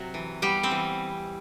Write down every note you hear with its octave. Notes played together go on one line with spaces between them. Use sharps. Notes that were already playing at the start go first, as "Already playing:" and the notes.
Already playing: C3 F#3 F#4
E3
G3 B3 G4
C4 C5
E3